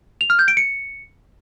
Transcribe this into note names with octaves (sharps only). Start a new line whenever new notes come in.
F7
F6
G6
D7
C#7